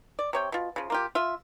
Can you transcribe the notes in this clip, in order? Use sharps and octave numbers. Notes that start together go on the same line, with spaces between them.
D5
C3 C#5 G5
B2 F4
C#3 F3
A#3 F4 G4
F4 E5